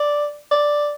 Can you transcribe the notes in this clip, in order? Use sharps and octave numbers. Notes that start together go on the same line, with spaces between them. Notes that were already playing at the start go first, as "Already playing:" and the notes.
Already playing: D5
D5